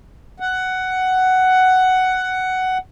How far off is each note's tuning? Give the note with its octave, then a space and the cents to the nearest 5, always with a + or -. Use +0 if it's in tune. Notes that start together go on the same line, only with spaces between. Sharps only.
F#5 +10